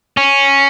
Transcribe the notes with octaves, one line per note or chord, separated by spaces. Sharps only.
C#4